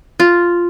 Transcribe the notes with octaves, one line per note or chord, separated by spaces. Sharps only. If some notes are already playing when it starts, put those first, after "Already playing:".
F4